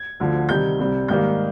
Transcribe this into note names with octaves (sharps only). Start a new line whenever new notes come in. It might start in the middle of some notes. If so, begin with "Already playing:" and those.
Already playing: G#6
D2 D3 F3
C3 D#3 G3 G6
C2 C3 G3
G#2 D#3 G3 A#3 G6